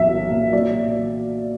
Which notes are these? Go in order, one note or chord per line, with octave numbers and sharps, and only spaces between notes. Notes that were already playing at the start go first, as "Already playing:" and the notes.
Already playing: B1 A#2 A#3 E5
F#3
A#2
F#3 D5